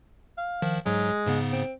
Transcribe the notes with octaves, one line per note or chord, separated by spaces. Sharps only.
F5
D#3 F3
G#2 F#3 G#3
G#2 C#3 B3
C4